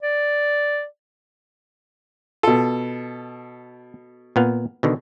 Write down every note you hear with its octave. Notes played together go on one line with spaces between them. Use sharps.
D5
B2 F4 A4
A#2 B3 F5
B2 D3 D#3